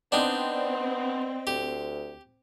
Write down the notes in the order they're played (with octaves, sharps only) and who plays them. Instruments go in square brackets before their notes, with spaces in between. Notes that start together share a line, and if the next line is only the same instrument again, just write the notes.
[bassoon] B3 [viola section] C4 [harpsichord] D4 D#4 [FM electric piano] D5 D#5 G5
[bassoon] D2 [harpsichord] G4